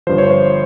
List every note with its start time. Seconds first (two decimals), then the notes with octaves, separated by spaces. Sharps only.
0.07 G1 G2 F3 C5
0.18 C#5
0.31 C5